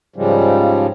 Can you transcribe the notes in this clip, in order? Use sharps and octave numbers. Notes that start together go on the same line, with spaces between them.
G#2 C#3 F3 G3 G#3